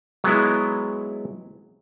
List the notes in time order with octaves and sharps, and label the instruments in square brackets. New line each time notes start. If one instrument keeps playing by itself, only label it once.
[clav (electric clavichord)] F#3 G#3 B3 E4